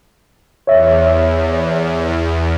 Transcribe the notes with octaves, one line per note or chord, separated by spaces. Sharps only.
E2 C#5 E5